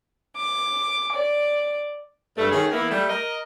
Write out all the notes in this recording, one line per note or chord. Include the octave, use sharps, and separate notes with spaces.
D6
D5
G2 A3
D#3 A3 C#4 G#4
E3 A#3 B3 E4 A#4
G3 A3
A#4 D#5